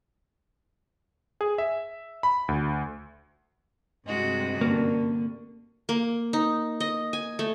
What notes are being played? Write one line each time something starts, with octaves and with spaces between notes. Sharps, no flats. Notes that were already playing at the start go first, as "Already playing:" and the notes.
G#4
E5
B5
D2
G2 C3 G#3 F#4 D#5
D3 A#3 C#4 A#4 A5
A#3
D#4
D#5
G#5
A3